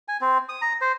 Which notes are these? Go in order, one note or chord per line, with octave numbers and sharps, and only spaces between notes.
G#5
C4
D#6
A#5
C5